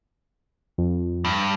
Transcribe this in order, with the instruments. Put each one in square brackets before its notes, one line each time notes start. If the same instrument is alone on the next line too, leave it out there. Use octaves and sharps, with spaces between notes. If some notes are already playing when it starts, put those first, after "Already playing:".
[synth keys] F2
[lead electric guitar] G2